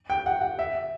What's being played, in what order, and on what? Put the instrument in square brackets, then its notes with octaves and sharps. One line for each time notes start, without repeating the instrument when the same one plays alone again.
[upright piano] G5
F#5
F#5
E5